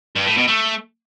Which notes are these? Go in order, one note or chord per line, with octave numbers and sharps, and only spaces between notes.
G2
A2
B2
A3